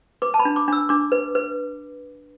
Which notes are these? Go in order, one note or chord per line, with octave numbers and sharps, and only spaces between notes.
B4 D6
A5
B5
D4
D6
D4 E6
D4 D6
B4
B4